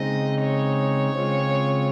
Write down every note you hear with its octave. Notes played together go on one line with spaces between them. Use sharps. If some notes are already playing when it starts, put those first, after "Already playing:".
Already playing: C#3 G#3 C4 D#4 D#5
C#5
C#3 G#3 C4 F4